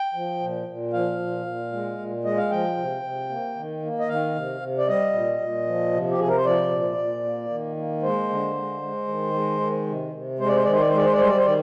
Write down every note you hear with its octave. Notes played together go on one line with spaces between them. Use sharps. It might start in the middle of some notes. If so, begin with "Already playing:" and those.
Already playing: G5
F3
A#2
A#2
F3 F5
A#2
A#2
G#3
A#2
G#3 D#5
F5
F3 G5
C3
C3
A#3
D#3
A#3
D#5
D#3 F5
C3
C3
D5
G3 D#5
A#2
A#2
F3
C3
G4
C3 G#4
A#4
C5
F3 D5
A#2
A#2
A#3
D#3
A#3
G#3 C5
D3
G#3
G#3
D#3
G#3
D#3
C3
C3
G#3 C5
D5
C5
D#3 D5
C5
D5
C5
G#3 D5
C5
D5
G3 C5
D5
C5
D#3 D5